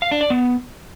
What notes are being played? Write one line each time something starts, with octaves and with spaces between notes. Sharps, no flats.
F5
D4
D5
B3